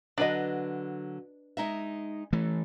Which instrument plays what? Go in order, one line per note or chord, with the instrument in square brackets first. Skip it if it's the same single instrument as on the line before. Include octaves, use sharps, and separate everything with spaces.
[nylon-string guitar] D3 F#3 [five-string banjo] D4 B4 D#5
[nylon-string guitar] G#3 D#4 E5
[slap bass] E3 A3